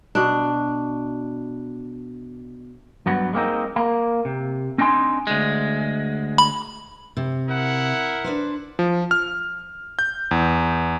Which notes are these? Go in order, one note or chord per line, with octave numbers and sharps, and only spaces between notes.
B2 D4
G2 F#3 B3
G#3 A#3 C4 D#4
A#3
C3
C4 D4 D#4 G#5 C6
D2 G#3
B5
C3
E4 A#4 F#5
D4 B4 C5
F3
F6
G6
E2